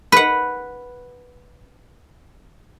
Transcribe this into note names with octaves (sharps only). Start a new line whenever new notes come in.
B4 F#5